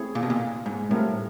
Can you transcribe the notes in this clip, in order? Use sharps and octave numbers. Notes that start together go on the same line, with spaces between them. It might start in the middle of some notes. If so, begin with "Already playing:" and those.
Already playing: A3 C4 E4 G#4 C#5
A#2
B2
A#2
G#2
A2 G3 C4 F4 A#4